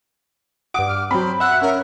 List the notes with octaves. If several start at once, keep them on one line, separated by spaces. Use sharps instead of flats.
G2 F#5 D6 D#6 D7
F6
F#3 C4 C5 B5
E5 F#5 F#6
C#4 A#4